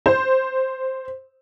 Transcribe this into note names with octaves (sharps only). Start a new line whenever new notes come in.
C5